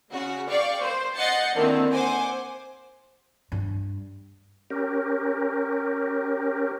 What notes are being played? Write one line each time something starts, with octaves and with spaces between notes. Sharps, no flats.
C#3 F#4
D5 F5 G5 C#6
C5
D#5 F#5 G6 A6 C7 C#7
D3 D#3 A#3 C4 E4
C5 F#5 G#5 D6
G2
C#4 G4 A#4